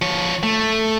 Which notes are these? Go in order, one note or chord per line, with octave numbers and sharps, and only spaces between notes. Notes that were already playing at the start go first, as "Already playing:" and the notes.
F3 C#5
A3